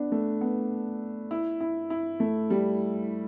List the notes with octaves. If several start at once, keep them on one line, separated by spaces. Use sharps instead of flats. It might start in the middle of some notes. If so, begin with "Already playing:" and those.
Already playing: B3 D4
A3
B3
E4
E4
E4
A3
G3